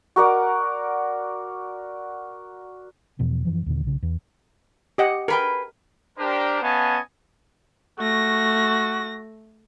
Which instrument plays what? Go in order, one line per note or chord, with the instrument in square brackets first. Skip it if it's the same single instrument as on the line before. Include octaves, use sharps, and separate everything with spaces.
[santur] F#4 A#4 D5 F#5
[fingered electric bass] E2 B2 E3 F3
F#2 E3 F3
D#2 A#2 D3
B1 C#3
E2 E3
[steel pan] G4 D#5 F#5
[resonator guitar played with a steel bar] G#4 B4 G5 [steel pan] A#4
[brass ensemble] D4 G4 A#4 C5
B3 C#4 D#5 F5 G#5 A5
[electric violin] A3 A#6 [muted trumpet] F#4